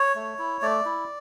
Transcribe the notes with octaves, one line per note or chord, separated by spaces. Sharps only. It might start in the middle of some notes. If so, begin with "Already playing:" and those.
Already playing: C#5
A3
E4
A3 D5
E4